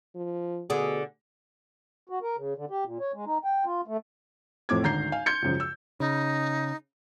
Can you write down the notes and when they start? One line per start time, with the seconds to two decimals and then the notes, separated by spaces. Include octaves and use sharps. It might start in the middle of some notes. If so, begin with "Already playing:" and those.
0.15 F3
0.70 B2 D3 G#4
2.10 F#4
2.22 A#4
2.37 C#3
2.56 D3
2.70 G4
2.85 A#2
3.00 C#5
3.14 G#3
3.26 D#4
3.44 G5
3.65 F4
3.88 A3
4.69 F2 A2 D6 G#6
4.83 G#1 D2 A#5 G6 C7
5.12 F5 G#5
5.26 C6 G6 G#6 C#7
5.42 C#2 F#2 F3
5.60 E6
6.00 C#3 D#4